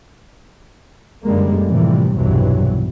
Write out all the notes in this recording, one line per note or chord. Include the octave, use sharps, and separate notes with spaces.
F#2 D3 G3 G#3 A#3
A2 C3 E3 F3 G3
B1 E2 G2 C3 E3 F#3